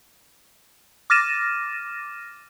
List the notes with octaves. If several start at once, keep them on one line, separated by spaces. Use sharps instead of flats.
D6 F6 A6 A#6 D#7 E7